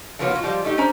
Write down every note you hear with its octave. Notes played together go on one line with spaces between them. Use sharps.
F3 F#3 A#3 B3 F4 C#5
F#3 F4
F3 G3 G#3 E4 F4
A3 D#4 G4
C#4 D4 C5 A#5